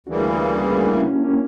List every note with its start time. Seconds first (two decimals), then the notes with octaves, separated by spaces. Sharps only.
0.06 D2 C#3 E3 G3 A#3 D4 F#4
0.67 G4
0.74 D4 F#4
0.91 C#4 E4
1.07 A#3 C#4
1.24 A#3 C#4